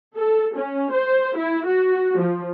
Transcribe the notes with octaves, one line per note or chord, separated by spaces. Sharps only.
A4
C#4
C5
E4
F#4
F3